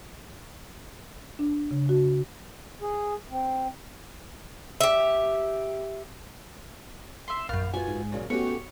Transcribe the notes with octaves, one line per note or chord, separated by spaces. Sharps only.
D4
C#3
F#4
G#4
C4
G4 E5
E5 C6
A#1 F#2 F5
B3 F4 F#4 G#5
G#2
A#2 C#3 F#3
A3 B3 C#4 F#4 G4 C#5